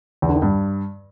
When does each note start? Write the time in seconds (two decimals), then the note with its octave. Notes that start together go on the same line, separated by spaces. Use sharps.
0.22 E2
0.29 D3
0.36 D#3
0.42 G2